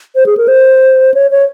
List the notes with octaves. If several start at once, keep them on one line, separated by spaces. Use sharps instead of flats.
C5
G#4
A#4
C5
C#5
C#5